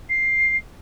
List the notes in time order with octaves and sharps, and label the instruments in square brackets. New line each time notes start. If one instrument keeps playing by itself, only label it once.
[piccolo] C7